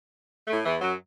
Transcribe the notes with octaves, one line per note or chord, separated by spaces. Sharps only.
A2 A3
E2 E3
F#2 F#3